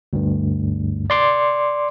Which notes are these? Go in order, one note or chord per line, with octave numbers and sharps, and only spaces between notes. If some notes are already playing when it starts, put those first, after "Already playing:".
D2 G2
D5 C6 D6